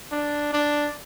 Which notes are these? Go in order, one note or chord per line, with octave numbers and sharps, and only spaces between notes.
D4
D4